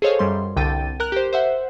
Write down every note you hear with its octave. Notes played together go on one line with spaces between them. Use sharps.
G#4 A4 C5 C#5 D#5 F5
F#2 G3 C6
C2 D3 G5 A6 D#7
A#4 A#5 F#6
G4 C5
C5 E5 F#5